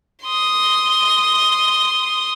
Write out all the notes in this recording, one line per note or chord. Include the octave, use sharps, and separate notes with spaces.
C6 D#6